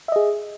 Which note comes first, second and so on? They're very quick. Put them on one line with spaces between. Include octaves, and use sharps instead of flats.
E5 D#5 G#4